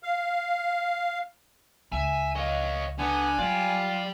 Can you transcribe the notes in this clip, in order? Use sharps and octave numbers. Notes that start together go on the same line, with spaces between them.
F5
C#2 E5 G#5
C#5 D#5 F5
D3 B3 G#5
F#3 F4 D5 G5